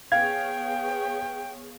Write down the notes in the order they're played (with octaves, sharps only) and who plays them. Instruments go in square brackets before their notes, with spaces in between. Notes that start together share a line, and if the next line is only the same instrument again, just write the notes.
[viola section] B3 G#4 C#5 [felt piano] F5 [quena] G5 [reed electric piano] G#6